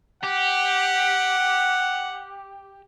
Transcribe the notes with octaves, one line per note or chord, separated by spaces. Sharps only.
G4 F#5